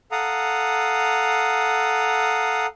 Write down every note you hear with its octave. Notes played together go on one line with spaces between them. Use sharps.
A4 F5 F#5 A#5 D#6